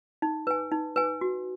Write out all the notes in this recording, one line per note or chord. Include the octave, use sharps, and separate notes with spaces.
D#4
B4 G#5
D#4
B4 G#5
F#4